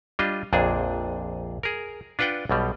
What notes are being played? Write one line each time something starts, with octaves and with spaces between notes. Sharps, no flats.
G3 D4 F4 D#5
A#1 F2 A#2 D4 G#4
G#4 A#4
D4 F4 B4 F#5 G5
B1 B2 G3